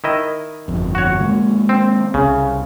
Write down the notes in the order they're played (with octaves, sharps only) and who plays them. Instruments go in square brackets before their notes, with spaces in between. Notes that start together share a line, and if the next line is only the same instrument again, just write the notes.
[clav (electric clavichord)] D#3 E4 D#5
[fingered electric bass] G1 F2
[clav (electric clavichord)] F#4 C#5
[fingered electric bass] D#3 G#3 A#3
[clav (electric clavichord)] C4
[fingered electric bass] C2 [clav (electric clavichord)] C#3